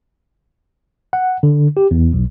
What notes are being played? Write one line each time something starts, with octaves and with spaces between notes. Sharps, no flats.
F#5
D3
G4
E2
B1